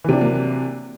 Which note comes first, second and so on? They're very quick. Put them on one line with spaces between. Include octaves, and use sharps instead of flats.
E3 C3 D4 F#3 A#3